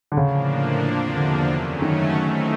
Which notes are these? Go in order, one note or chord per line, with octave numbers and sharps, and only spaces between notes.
D3
A2 C#3 F3 A#3 D4
E2 C3 F3 A#3 D4
D3
F#2 C#3 F#3 A3 C#4
D#3
A2 E3 A3 C4 D#4